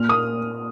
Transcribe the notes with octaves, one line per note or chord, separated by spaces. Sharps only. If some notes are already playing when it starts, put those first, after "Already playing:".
Already playing: A#2 F6
A#3 D#6